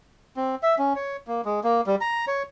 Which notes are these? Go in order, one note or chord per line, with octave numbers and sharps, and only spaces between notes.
C4
E5
C#4
C#5
A#3
G#3
A#3
G3
A#5
C#5